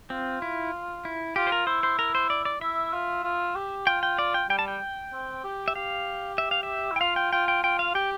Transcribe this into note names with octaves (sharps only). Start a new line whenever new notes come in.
C4 F4
E4
E4
F4 G4
C5
A#4
E4 C5
C5
A#4
C5
D5
D5
E4 E5
F4
F4
G4
F4 G5
G5
D5
G5
G3 G5
A5
G5
C4
G4
E5
G4 F5
E5
F5
E5
E4
G5
F4 F5
G5
F4 G5
G5
F4 G5
F5
G4 G5